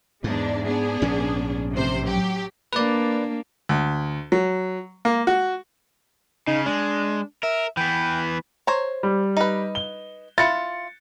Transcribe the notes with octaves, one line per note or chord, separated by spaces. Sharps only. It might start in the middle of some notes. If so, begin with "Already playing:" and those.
E2 G#2 G#3 D4
B3 D4 G#4
A#1 G#2 C#4
A1 C3 C5
F#3 G4
A#3 D4 B4 D5
D2
F#3
A#3
F#4
C#3 D#4
G#3 D4
A#4 E5
E3 B3 G5
C5 C#5 A#5
G3
D#4 B4
G7
E4 F4 A6 C#7